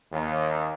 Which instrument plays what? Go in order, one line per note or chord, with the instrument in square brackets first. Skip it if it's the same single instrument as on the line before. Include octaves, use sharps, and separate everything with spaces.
[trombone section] D#2